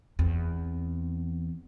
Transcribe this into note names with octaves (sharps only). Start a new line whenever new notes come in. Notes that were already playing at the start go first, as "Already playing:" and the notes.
E2 C4